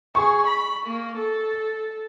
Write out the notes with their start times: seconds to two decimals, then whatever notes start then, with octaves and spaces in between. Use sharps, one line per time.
0.15 G#4 C#6
0.47 B5
0.87 A#3
1.18 A4